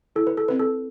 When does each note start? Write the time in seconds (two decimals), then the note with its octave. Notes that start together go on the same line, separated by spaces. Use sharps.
0.16 E4 A4
0.27 B4
0.37 A4
0.48 C4 B4
0.59 A4